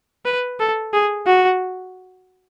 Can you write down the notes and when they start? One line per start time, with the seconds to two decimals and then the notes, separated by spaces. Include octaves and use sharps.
0.26 B4
0.60 A4
0.94 G#4
1.27 F#4